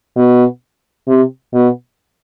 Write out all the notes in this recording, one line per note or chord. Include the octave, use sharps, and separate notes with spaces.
B2
C3
B2